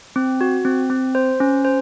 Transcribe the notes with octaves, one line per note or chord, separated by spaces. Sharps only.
C4
F#4
C4
C4
C5
C#4
C5